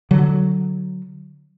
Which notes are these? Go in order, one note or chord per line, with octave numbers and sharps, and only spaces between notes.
D3 F#3